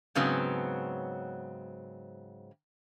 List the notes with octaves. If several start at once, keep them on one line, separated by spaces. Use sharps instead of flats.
G#2 C#3 F#3 B3 C4